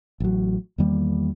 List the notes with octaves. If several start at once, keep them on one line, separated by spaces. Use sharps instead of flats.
A1 F#3
E2 D#3 G3 A#3